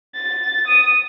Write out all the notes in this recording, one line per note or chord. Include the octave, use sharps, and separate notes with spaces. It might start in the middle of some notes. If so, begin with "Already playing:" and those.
A6
D#6